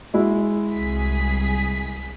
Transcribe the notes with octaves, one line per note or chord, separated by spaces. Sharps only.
G#3 E4 F#4
C2 G#4 B6